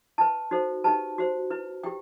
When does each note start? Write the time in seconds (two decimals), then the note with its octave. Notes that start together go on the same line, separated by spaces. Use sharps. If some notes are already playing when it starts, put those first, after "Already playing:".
0.18 E4 B4 A5
0.51 D#4 F#4 A4 C5
0.84 D#4 G4 B4 A5
1.18 F#4 C5
1.50 E4 B4
1.83 E4 G4 G5